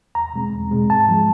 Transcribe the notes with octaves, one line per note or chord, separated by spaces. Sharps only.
E2 A#5
B2 G#3 C4
E2
B2 G#3 C4
G#2 A5
F3 G#3